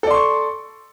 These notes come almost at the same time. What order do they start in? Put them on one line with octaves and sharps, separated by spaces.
A4 D5 C6 C#6